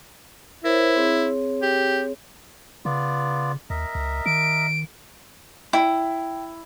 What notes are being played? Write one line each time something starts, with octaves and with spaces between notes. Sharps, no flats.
E4 A#4 C5 C#5
C4 G#4 C#5
G4
C#3 B3 F4 D5
D#2 A#4 D#5 E5
C#2
D#3 D7
E4 G5